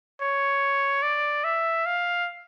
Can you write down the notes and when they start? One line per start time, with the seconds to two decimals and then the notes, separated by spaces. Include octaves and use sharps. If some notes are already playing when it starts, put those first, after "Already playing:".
0.21 C#5
1.02 D5
1.44 E5
1.86 F5